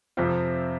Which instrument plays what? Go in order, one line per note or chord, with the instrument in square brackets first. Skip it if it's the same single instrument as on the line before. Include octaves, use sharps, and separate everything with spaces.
[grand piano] F2 C3 F3 C4 F4